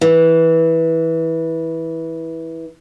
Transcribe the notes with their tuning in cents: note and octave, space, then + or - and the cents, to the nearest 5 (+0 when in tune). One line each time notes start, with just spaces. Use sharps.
E3 -15